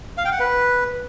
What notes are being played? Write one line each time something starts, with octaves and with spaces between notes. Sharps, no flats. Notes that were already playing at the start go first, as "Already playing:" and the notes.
F5
G5
F#5
B4